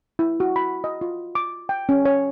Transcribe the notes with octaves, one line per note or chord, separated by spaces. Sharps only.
E4
F#4
B5
D#5
F4
D6
G5
C#4
C#5